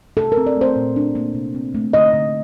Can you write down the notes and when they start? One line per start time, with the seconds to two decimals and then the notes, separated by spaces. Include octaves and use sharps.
0.17 C3 A4
0.32 A#4
0.37 C4
0.47 D5
0.57 A3 C5
0.76 A#2
0.96 D4
1.15 A#3
1.35 C3
1.55 C4
1.75 A3
1.93 D3 D#5
2.13 D3